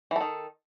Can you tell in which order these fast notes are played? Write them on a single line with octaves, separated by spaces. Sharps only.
E3 A4 D#3